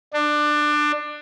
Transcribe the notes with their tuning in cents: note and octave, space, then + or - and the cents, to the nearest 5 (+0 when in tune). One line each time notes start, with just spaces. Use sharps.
D4 +20